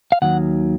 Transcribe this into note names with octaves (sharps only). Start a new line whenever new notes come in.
F5
D#2 D#3 F#3 F#5